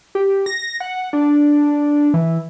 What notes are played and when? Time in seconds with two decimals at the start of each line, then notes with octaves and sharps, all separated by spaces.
0.15 G4
0.46 A#6
0.80 F#5
1.13 D4
2.14 E3